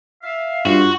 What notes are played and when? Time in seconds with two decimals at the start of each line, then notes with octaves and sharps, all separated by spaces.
0.23 E5 F5
0.66 G2 F4 F#4